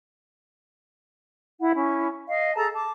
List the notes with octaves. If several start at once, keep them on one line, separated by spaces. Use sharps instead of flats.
E4 F#5
C#4 E4
D#5 F5
G#4 A4 A5 A#5
A5 D6